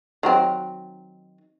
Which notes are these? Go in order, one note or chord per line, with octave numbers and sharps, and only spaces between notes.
D#3 F#3 C4